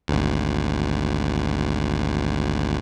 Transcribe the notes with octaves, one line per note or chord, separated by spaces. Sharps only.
G#1 D2